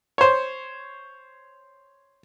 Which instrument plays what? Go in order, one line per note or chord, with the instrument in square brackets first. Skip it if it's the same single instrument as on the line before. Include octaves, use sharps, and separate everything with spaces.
[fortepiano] C5 C#5